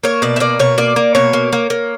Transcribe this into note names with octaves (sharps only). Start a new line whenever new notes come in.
A#3 C#5
B2 D5
E5
A#3 D5
B2 C#5
A#3 D5
A#3
B2 C#5
A#3
A#3
A#3